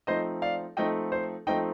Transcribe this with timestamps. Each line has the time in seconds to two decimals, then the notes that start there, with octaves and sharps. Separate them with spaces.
0.07 F3 A3 C4 D#4 C5 D#5
0.42 D5 F5
0.77 F3 A3 C4 D#4 D#5 G5
1.12 C5
1.47 F3 A3 C4 D#4 D#5 G5